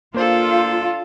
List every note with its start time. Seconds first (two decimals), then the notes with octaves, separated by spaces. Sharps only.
0.14 A#3 D4 F4 A4 C5